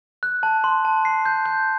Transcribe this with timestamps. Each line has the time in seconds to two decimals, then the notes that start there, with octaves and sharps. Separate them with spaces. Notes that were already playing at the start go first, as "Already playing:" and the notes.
0.23 F#6
0.43 A5
0.64 C6
0.85 A5
1.05 C7
1.26 G6
1.46 G6